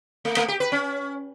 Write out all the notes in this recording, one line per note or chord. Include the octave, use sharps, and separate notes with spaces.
A3
A3
G4
B4
C#4